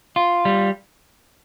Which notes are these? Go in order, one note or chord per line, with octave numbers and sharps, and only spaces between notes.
F4
G3